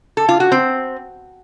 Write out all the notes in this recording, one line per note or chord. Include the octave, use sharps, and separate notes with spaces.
A4
F4
F#4
C4